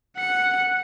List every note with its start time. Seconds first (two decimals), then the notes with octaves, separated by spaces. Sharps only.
0.17 F#5 C#7